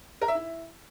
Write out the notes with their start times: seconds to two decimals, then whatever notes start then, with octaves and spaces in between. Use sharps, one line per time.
0.22 A#4
0.28 E5
0.35 E4